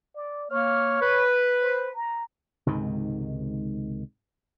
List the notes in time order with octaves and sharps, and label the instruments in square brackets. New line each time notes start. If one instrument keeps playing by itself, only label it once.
[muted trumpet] D5
[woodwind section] A#3 F6 [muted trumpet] C#5
[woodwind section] B4
[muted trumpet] C5
A#5
[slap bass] C#2 G#2 C3 D#3